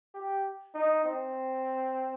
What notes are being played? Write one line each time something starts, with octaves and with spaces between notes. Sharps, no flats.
G4
D#4
C4